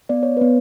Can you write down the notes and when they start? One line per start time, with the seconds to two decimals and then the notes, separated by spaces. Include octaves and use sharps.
0.09 B3 D5
0.23 C#5
0.37 B3 B4